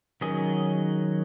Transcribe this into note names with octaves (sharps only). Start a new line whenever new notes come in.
D#3 F#3 C#4 G#4 D#5